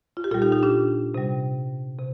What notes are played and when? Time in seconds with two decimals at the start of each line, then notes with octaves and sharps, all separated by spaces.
0.17 F4
0.24 G4
0.31 A#2 F4 A4
0.34 G3
0.42 D#4 G4
0.52 D#4 G4
0.63 D4 F4
1.14 C3 G3
1.99 C3